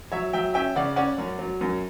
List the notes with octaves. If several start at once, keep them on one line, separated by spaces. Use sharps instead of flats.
F#3 C#5 E5
F#3 E5 G5
C#4 E5 G5
C#3 D5 F#5
C#4 D5 F#5
F#2
F#3
F#2